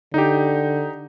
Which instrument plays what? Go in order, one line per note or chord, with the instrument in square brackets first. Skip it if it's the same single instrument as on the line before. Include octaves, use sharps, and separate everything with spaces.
[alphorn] D3 [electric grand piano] D#4 G4